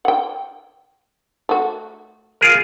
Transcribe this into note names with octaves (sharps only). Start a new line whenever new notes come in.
F#5 G5
A3 F#4
F4 G#4 A#4